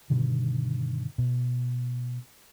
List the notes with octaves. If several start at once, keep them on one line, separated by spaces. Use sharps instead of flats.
G2 B2 D3 D#3
B2